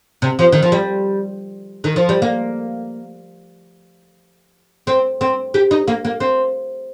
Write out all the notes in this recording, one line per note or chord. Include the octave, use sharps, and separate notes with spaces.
C3
F3
D#3
F3
G3
D#3
F3
G3
A#3
C4
C4
G4
D#4
A#3
A#3
C4